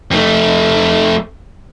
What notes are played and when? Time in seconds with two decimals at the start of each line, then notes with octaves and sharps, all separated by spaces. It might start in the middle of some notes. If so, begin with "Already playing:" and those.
0.11 F2 A3